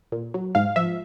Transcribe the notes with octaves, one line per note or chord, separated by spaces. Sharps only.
A#2
F#3
G#2 F5
F3 E5